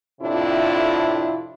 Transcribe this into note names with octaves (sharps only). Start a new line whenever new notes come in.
F2 A2 C3 D4 E4 F4